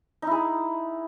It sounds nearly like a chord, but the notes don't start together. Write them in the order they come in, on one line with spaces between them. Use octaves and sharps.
D#4 E4 G#4